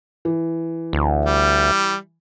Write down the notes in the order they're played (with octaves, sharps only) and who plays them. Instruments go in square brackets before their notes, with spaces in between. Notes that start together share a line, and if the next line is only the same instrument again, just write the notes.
[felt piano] E3
[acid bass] D2
[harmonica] G3